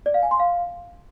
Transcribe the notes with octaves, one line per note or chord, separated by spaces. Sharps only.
D5
F5
G#5
C6
F5